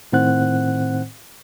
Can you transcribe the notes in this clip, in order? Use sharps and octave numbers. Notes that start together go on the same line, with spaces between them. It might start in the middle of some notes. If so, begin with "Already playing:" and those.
A2 D#3 C4 C5 F#5 F#6